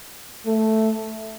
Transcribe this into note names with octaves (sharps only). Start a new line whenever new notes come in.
A3